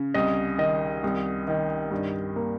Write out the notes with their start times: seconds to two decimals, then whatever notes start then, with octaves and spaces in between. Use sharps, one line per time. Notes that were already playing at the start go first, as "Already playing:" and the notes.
Already playing: C#3
0.14 C2 D#5
0.58 D#3 D#5
1.04 C2
1.48 D#3
1.91 G2
2.36 A#3